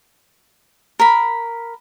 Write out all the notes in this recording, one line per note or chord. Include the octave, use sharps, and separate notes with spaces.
A#4 B5